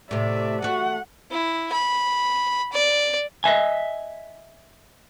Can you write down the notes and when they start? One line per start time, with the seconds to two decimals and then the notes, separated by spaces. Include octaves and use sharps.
0.11 A2 C3 D5 E5
0.62 A3 F#4 F#5
1.31 E4
1.72 B5
2.72 D5
3.44 D#5 E5 G#5